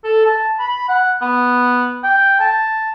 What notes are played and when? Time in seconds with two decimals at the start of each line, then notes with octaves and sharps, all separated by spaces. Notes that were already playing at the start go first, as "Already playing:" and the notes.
0.04 A4
0.26 A5
0.59 B5
0.88 F#5
1.22 B3
2.03 G5
2.40 A5